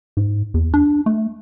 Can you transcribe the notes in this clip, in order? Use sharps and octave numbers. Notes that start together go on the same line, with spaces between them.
G#2
E2
D4
A3